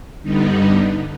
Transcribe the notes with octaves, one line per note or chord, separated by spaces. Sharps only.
G2 D3 G3 B3 D#4